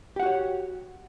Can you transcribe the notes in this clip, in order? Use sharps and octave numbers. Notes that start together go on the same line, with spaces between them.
F#4 G4 C#5 F#5